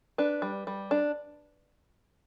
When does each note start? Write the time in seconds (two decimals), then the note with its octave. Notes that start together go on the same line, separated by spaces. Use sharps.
0.18 D4 B4
0.42 G3
0.67 G3
0.91 D4